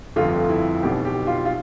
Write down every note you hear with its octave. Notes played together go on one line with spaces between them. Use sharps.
G1 F2 D3 A3 F4
E4
B1 B2 B3 G4
G4
F4
F4